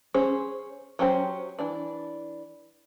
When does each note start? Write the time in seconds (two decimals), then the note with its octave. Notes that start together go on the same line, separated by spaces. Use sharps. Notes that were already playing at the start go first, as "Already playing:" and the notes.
0.14 C#4 G#4 C5
0.99 F#3 C#4 G4 C5
1.59 E3 D4 D5